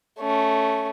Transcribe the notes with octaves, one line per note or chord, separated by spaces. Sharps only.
A3 C#4